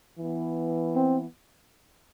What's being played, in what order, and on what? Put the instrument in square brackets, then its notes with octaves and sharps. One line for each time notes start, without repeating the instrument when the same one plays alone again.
[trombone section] E3 B3
C4